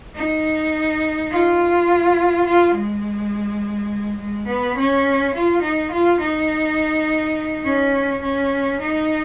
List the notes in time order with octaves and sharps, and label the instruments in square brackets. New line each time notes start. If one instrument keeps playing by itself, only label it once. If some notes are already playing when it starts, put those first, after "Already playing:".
[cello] D#4
F4
F4
G#3
G#3
B3
C#4
F4
D#4
F4
D#4
C#4
C#4
D#4